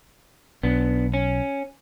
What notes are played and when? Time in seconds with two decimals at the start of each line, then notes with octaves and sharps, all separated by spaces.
0.63 B1 B3 D4
1.14 C#4